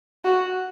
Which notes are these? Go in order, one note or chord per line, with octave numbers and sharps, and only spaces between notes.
F#4